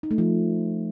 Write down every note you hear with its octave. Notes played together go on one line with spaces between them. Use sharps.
D#4
A3
F3